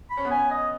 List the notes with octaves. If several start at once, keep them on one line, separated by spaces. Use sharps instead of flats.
B5
C#4
B3
C#4 G#5
D#5